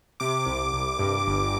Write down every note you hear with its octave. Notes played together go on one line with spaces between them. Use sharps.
C3 D6
C2
C2
G2
G1